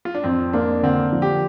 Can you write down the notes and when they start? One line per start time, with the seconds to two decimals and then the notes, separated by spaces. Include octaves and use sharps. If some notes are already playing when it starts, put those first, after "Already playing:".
0.05 F4
0.15 D4
0.24 F2 C4
0.53 A#3 D4
0.83 D3 C4
1.12 F3
1.22 G4